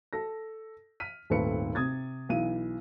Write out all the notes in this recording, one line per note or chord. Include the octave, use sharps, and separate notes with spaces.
A4 A#6
F6 B6 D#7
D#1 G#1 A3 A4 B4 C#7
C3 D#6 G#6 A6
B1 E3 D#7